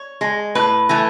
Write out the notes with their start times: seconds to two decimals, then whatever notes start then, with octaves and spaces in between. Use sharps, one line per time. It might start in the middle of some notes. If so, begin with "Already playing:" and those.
Already playing: C#5
0.21 G#3
0.55 A2 B4
0.89 E3 A3